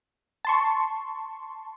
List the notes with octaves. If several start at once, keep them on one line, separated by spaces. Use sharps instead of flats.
A5 C6 C#6